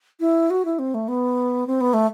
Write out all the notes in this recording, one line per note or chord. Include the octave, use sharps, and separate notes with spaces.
E4
F#4
E4
C4
A3
B3
C4
B3
A3